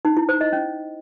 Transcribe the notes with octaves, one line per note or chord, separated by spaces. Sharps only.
D#4
E4
C5
D#5
C#4